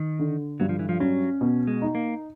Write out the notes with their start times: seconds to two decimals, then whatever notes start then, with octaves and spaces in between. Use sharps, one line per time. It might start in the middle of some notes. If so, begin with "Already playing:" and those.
Already playing: D#3
0.19 D3
0.60 G2 F#3
0.69 F3
0.79 E3
0.89 F3
1.00 F#3 C#4
1.41 B2
1.67 G#3
1.82 D#4
1.95 A#3